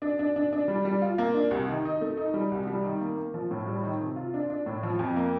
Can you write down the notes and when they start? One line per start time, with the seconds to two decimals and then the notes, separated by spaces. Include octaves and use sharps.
0.02 D4
0.19 D4
0.36 D4
0.53 D4
0.68 G3
0.85 G3
1.02 F4
1.18 A#3
1.34 D4
1.51 C2
1.68 D#3
1.85 D#4
2.01 A3
2.17 D#4
2.34 G3
2.51 C2
2.67 G3
2.84 D#3
3.01 A#3
3.17 A#3
3.34 F3
3.51 A2
3.66 G3
3.83 D#3
4.00 C3
4.16 F4
4.34 D4
4.50 D4
4.66 A2
4.83 F3
4.99 F2
5.16 A#3